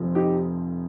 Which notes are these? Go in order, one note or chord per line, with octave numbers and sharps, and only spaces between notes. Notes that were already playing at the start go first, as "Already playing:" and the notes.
Already playing: F1 F2 C3 F3
D#4 G4